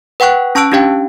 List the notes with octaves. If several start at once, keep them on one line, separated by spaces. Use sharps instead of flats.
B4 F#5 G5 C#6 F#6
C#4 A5 C#6 E6 F#6 D7
C#4 D4 G4 F5 G5